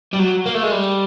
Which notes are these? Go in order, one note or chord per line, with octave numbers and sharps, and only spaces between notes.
G3
F#3
A#3
A3
G#3
G3